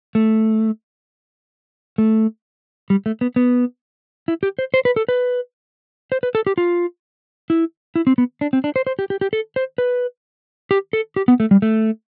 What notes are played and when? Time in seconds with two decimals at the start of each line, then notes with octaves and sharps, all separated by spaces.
0.15 A3
1.98 A3
2.90 G3
3.06 A3
3.21 B3
3.36 B3
4.28 E4
4.43 G4
4.59 C5
4.74 C5
4.85 B4
4.96 A4
5.09 B4
6.12 C5
6.23 B4
6.35 A4
6.47 G4
6.58 F4
7.50 E4
7.96 E4
8.07 C4
8.18 B3
8.41 D4
8.53 C4
8.64 D4
8.76 C5
8.87 C5
8.99 G4
9.10 G4
9.21 G4
9.33 A4
9.56 C5
9.78 B4
10.71 G4
10.93 A4
11.16 G4
11.28 B3
11.40 A3
11.51 G3
11.62 A3